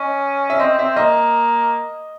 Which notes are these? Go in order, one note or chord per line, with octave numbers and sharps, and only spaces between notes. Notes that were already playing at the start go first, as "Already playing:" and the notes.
Already playing: C#4 D#5
E5
C4 D#5
C4 E5
A#3 D#5